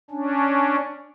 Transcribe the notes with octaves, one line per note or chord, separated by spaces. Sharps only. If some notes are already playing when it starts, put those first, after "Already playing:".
C#4 D4